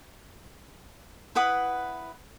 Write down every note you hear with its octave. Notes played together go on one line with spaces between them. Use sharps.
E4 B4 F#5 D#6